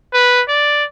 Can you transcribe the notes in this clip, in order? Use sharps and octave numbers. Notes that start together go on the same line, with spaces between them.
B4
D5